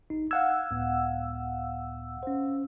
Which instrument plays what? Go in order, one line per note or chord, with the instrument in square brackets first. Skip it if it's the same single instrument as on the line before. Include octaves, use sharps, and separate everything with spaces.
[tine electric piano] A1 D#4
[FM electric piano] F5 F#5 E6 [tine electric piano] G#6
[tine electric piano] C#2 A2 B3
C#4 C5